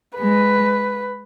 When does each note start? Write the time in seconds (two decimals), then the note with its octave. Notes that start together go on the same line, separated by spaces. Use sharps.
0.18 G#3 B4